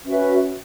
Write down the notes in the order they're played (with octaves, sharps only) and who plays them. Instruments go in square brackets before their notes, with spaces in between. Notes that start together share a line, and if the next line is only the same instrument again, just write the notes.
[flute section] C#4 F#4 B4 E5